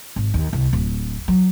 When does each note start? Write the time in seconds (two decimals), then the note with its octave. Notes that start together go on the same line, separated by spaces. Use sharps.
0.16 G#1
0.34 D#2
0.53 C2
0.73 D1
1.28 F#3